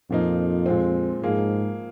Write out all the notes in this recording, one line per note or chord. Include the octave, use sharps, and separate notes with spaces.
F2 A#2 F3 A#3 D#4
A#2 G#3 C4
G#2 F3 A#3 G#4